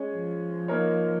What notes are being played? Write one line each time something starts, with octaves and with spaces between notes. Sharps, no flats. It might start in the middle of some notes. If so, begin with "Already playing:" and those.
Already playing: G#3 C#4 G#4 C#5
F3
A#3 D#4 A#4 C#5